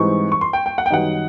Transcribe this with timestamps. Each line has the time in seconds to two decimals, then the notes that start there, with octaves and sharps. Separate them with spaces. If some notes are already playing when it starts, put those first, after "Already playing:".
Already playing: G#2 E3 G3 C4 D#4 C#6
0.32 C#6
0.41 C6
0.53 G5
0.66 G5
0.78 F#5
0.86 G5
0.90 F#2 D#3 G3 B3 D#4 F#5